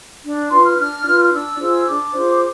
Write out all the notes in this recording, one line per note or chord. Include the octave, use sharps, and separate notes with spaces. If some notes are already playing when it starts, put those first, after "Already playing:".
D4
F4 B4 C6
F6
D4 F6
F4 B4
F6
D4 E6
F4 G#4 C5
D4 D6
F4 G#4 C5